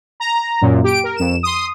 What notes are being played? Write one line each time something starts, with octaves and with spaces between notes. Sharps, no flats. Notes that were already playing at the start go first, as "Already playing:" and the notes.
A#5
F#2 A#2
G4 D7
A#4
F2 E7
C6 D#6